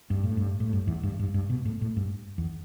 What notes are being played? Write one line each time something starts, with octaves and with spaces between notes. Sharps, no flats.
G2
A2
G2
A2
G2
E2
G2
G2
G2
B2
A2
A2
G2
E2